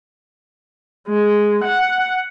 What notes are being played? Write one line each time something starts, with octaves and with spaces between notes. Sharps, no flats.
G#3
F#5